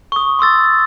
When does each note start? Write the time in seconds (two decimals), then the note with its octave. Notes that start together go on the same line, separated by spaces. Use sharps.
0.12 C#6 D#6
0.39 C6 C#6 E6 A6